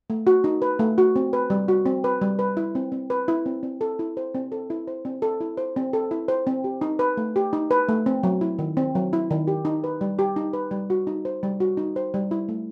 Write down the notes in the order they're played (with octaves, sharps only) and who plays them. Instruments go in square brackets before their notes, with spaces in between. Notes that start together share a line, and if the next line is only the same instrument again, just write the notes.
[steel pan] A3
F#4
D#4
B4
A3
F#4
C4
B4
G3
F#4
C4
B4
G3
B4
E4
C4
C4
B4
E4
C4
C4
A4
E4
C5
C4
A4
E4
C5
C4
A4
E4
C5
C4
A4
E4
C5
C4
G4
D#4
B4
A3
G4
D#4
B4
A3
C4
F#3
E4
D#3
C4
F#3
E4
D#3
G4
D#4
B4
G3
G4
D#4
B4
G3
F#4
D#4
C5
G3
F#4
D#4
C5
G3
E4
A3